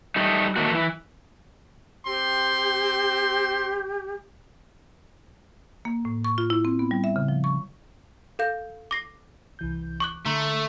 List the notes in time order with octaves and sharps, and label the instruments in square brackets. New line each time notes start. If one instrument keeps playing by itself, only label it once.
[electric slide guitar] G3 A3 D#4
D#3 A3 A#3 F#4
E3 E4
[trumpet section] C4 C6 [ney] G4
[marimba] A#3
A2
C#6
F4
E4
C4
B3
G3
E5
C#3
F3
C#6
[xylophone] A4 F5 G6
D6 A#6 C7
[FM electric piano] C2 E3 G6
[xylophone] C#6 D6 F#6
[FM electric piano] D3 A#5 C6 [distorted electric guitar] A3